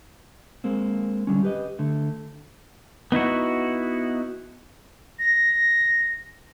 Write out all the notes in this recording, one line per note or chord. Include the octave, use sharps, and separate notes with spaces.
G#3 A#3 C4
D3 G3 C#4
G4 B4 D#5
D3 A3
B3 D#4 E4 F#4
A#6